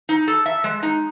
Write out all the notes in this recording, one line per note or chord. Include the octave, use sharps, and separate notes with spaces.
D#4
A4
E5
G#3
D#4